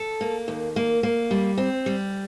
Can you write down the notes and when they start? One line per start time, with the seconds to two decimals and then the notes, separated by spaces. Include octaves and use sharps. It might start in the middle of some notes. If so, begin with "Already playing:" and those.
Already playing: A4
0.21 A#3
0.48 D#2
0.76 A#3
1.03 A#3
1.31 G3
1.58 C4
1.86 G3